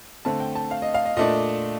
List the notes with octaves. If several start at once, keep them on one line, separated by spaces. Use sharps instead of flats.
D3 A3 C4 A5
G5
A5
F5
D#5
F5
D#5
A#2 A3 D4 D#5